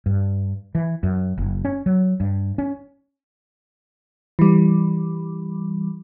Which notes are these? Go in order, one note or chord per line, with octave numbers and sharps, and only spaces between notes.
G2
E3
F#2
F#1
C#4
F#3
G2
C#4
E3 G3